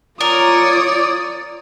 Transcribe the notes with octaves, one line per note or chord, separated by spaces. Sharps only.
F4 A#4 C#5 D5 D#6